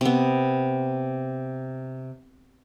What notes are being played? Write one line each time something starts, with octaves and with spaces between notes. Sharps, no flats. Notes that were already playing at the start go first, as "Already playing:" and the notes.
C3 B3